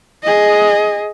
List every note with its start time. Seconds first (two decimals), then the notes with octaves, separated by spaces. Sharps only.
0.24 G#4 D#5